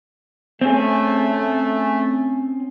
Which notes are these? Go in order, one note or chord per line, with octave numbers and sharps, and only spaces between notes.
A3 C4 C#4 G#4